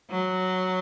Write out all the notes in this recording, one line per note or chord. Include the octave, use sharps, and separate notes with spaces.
F#3